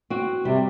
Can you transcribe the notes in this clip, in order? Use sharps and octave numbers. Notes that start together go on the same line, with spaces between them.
C4 F#4
C3 G3